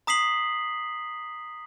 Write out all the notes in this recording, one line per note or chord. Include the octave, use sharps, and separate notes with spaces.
A#5 D#6 B6 C7 F#7